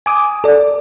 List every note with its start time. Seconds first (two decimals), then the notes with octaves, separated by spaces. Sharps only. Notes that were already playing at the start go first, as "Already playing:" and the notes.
0.06 G#5 D6 D#6
0.44 A4 D5